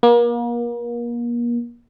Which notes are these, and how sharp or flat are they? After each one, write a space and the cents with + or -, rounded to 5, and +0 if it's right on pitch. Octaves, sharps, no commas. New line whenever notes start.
A#3 +35